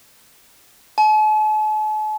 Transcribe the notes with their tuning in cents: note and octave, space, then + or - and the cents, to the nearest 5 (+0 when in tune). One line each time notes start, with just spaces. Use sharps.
A5 -45